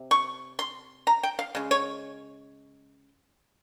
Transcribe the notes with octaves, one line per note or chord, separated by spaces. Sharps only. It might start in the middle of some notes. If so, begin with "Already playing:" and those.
Already playing: C3
C#6
C6
A#5
G5
F5
C#3 G#3
C#5